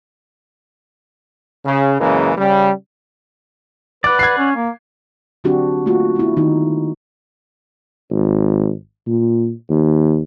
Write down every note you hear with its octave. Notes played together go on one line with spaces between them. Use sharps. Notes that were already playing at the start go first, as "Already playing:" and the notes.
C#3
F#2 C#3 E3 G#3 A#3
C#3 G3
B4 D5 F#5 D6
G#6 C7
C#4
A#3
D3 F#3 C4 D4 F#4 G4
A3 A#3 F4 F#4
B3 E4
D#3 D#4
G#1
A#2
D#2